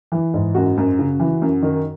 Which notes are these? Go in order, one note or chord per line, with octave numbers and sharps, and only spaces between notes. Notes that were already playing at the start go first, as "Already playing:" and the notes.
E3
G#2
F#2 F#4
F#2
C#3
E3
F#2
D#3